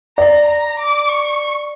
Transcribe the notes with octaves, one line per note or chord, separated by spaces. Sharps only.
D5 A#5
A#5
D6
C#6